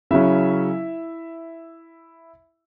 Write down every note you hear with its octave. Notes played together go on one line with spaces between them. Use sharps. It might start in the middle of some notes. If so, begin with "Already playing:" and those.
C#3 F#3 C#4 E4 E5